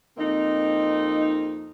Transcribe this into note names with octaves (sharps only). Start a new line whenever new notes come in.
F2 A#3 C4 D#4